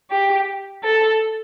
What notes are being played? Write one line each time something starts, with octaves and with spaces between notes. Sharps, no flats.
G4
A4